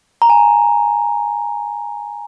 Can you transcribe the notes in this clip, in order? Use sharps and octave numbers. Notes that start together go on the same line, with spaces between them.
A#5
G#5